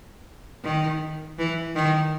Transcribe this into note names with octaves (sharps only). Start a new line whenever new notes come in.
D#3
E3
D#3